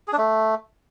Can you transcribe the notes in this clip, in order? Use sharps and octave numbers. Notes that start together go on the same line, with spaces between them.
G#4
D4
A3